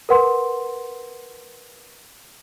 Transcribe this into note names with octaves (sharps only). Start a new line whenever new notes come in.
A#4 B4 F#5 C6